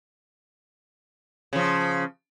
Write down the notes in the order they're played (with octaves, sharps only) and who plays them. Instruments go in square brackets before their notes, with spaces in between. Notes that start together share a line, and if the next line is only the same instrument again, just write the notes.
[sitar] C#3 F3